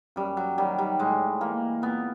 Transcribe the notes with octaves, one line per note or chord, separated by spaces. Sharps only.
F#2 G3
F#3
D#3 F#3 G3
G3
A2 G#3
E3 A#3
A#2 B3